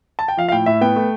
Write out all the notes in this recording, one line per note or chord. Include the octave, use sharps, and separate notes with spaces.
A5
G5
F3 F5
F5
A2 G5
A2 E5
B3 G5
A3